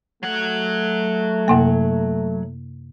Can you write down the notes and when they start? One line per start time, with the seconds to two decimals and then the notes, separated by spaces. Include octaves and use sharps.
0.23 F#3 A3 F#5
1.48 F#2 C3 A#3